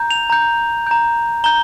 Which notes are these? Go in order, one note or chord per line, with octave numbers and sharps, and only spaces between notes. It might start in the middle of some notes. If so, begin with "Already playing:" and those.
Already playing: A#5 G6
F7
A#5 G6
A#5 G6
A#5 G6 G7